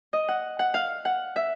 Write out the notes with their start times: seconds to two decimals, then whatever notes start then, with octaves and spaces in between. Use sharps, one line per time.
0.13 D#5
0.28 F#5
0.59 F#5
0.74 F5
1.05 F#5
1.36 E5